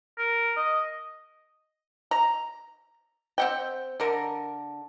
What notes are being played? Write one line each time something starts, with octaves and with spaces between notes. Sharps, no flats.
A#4
D#5
A#5
C4 F#5 G5
D3 A#4